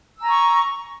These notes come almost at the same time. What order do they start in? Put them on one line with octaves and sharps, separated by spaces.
E6 G#5 A#5 C#6